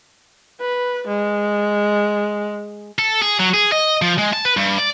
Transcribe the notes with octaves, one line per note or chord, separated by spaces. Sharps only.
B4
G#3
A4
G#4
F#3
G#4
D#5
F3
G#3
A5
B4
G2
D5